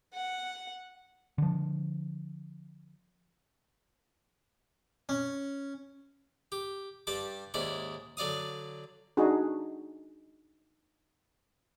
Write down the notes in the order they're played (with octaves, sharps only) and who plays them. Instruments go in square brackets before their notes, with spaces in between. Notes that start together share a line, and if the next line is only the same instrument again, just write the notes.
[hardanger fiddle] F#5
[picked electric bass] D3 F3
[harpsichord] C#4
G4
G2 G3 A5 D6
D#2 G#2 C#4 E4 D5
D3 F#3 D5 F5 D#6
[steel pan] D4 D#4 F#4 G#4